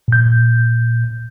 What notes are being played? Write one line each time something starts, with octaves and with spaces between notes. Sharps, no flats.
A#2 G6